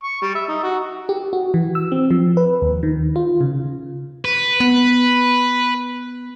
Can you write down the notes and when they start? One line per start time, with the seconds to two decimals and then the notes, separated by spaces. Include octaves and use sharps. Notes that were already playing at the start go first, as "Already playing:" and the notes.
0.04 C#6
0.22 G3
0.35 E5
0.48 D#4
0.63 F#4
1.09 G4
1.33 F#4
1.54 E3
1.75 E6
1.92 C4
2.11 F3
2.37 B4
2.62 D#2
2.83 D#3
3.16 F4
3.41 C#3
4.25 B4
4.60 B3